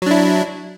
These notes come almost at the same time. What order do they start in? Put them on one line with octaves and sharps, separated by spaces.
F#3 D4 E4